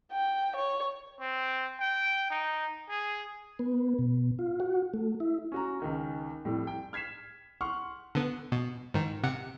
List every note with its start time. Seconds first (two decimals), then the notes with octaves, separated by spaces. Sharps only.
0.12 G5
0.56 C#5
1.20 C4
1.80 G5
2.31 D#4
2.89 G#4
3.59 B3
3.99 B2
4.39 F4
4.60 F#4
4.94 A3
5.20 E4
5.52 C#4 F#4 A#5
5.80 C#2 D#3 C#4
6.45 F2 A2 G3
6.67 G5
6.93 F6 G#6 B6 C7 E7
7.61 F#5 C6 C#6 F6
8.15 D3 B3
8.52 B2
8.94 G#2 D#3
9.23 C3 F#5 C#7